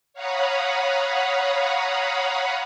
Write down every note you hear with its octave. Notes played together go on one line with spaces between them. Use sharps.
C#5 F5 F#5 A#5 B5 D#6